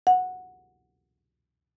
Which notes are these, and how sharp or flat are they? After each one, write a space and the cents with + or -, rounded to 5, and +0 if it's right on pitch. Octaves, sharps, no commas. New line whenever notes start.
F#5 -10